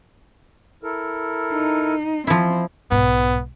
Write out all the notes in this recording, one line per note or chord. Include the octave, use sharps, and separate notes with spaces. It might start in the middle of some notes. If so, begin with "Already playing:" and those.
E4 A4 A#4
D#4
F3 C4 E4
B1 G#2 B3